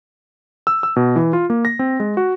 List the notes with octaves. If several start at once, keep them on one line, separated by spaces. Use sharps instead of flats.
E6
E6
B2
E3
F4
A#3
A#6
C4
G#3
F#4